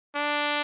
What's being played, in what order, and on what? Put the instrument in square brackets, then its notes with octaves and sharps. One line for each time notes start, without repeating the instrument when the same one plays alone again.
[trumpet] D4